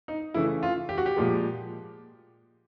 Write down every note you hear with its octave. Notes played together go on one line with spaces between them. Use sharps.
D#4
C#3 E3 A3 E4
F4
G4
F#4
G4
A#2 F3 G#3